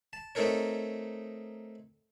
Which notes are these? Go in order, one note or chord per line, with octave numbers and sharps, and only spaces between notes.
A5
A3 C4 D#4 A4 A#4 C#5